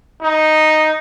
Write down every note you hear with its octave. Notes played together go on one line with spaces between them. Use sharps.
D#4